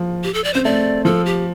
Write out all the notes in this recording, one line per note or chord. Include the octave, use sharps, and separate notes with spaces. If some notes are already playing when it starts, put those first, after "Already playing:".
Already playing: F3
G4
A4
D5
C4 C5
A3 D5
F3 A4
G4